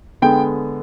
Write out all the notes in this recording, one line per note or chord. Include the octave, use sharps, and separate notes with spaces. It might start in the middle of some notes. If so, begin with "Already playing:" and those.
D3 G#3 B3 G5